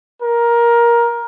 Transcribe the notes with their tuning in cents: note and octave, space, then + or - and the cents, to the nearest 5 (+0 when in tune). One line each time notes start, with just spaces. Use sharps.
A#4 +15